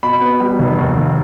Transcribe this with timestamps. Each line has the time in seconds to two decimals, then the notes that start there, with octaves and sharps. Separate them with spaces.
0.03 B2 B5
0.21 B3
0.40 G3
0.59 F1
0.78 D#2
0.97 D#2